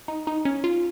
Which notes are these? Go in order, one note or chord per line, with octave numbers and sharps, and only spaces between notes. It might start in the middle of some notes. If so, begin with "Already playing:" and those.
D#4
D#4
C#4
F4